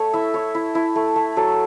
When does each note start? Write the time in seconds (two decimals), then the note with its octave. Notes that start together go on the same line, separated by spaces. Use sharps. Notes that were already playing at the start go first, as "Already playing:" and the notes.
Already playing: A3 A4 C#5
0.13 E4 E5
0.34 E4 C#5
0.55 E4
0.75 E4
0.96 A3
1.16 A3
1.37 F#3 A4